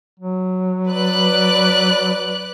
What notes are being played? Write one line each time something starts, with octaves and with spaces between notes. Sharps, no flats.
F#3
B4 D5 F#6